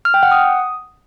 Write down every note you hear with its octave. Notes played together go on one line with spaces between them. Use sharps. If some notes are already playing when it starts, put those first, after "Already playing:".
F6
G5
F#5
D#6